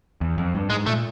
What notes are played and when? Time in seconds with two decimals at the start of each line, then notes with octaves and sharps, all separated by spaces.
0.21 E2
0.38 F2
0.55 G2
0.70 G#2 G#3
0.86 A#2 A3